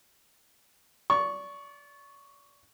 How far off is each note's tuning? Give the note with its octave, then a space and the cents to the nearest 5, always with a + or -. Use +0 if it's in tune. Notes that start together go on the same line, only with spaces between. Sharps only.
D5 -30 C#6 +0